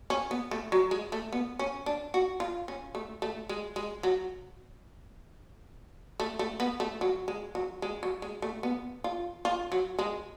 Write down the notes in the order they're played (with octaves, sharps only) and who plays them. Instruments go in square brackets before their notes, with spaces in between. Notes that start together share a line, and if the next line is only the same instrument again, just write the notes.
[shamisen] C#4
B3
A3
F#3
G#3
A3
B3
C#4
D4
F#4
F4
C#4
A3
A3
G#3
G#3
F#3
A3
A3
B3
A3
F#3
G#3
F#3
G#3
F#3
G#3
A3
B3
F4
F4
F#3
G#3